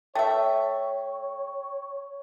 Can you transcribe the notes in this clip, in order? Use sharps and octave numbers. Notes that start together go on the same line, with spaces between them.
A3 C#5 E5 G5